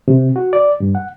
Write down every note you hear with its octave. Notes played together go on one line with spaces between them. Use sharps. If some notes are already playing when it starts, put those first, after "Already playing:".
C3
F#4
D5
G2
F#5